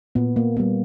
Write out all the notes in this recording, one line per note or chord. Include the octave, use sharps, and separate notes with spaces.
A#2 B3
A#3
G3 A#3 B3